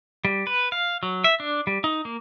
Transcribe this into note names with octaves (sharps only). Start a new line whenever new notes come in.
G3
B4
F5
F#3
E5
D4
G3
D#4
A#3